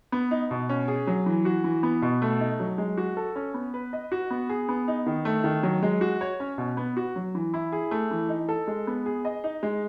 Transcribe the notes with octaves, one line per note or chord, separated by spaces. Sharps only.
B3
D#4
B2
C#4
G#4
F#3
E3
F#4
E3
B3
B2
A3
D#4
F#3
G#3
F#4
A4
C#4
B3
B4
D#5
F#4
B3
G#4
B3
D#4
D#3
A3
D#3
F#3
G#3
F#4
C#5
C#4
B2
B3
F#4
F#3
E3
E4
G#4
A3
E3
D#4
A4
G#3
B3
G#4
D#5
D#4
G#3